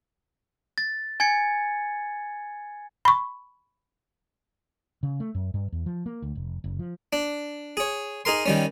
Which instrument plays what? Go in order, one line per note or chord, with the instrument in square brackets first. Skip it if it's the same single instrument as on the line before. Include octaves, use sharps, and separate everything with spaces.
[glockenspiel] A6
G#5 G#6 A6 C#7
[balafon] B5 C#6
[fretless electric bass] C#3
A3
F#2
G2
E2
F3
A#3
D2
F1
F#1
F3
[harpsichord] D4
G#4 C#5
D#4 G#4 A#4 C6
D#3 G3 C#4